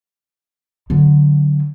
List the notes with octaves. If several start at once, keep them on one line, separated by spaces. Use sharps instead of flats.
D3 F#3